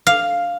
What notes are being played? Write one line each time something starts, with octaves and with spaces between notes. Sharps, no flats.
F5